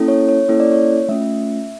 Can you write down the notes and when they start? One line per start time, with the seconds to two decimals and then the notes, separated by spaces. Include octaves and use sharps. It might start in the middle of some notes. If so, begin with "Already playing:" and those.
Already playing: A#3 C#4 E4 A4
0.08 C#5
0.29 C#5
0.48 A#3 C#4 E4 A4 C#5
0.60 D5
0.72 C#5
1.09 A3 C#4 F4 E5